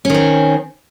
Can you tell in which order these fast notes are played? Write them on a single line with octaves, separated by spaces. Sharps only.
C#4 D#3 C4